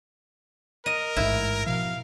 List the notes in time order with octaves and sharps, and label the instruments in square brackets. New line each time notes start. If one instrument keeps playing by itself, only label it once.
[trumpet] A#4 [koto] D#5
[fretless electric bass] A1 G#2 [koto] E4
[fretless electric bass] B2 F3 [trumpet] F5